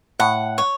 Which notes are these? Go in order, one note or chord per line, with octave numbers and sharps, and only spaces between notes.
A2 F#5
C#5